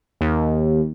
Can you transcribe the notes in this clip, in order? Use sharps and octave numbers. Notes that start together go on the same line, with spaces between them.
D#2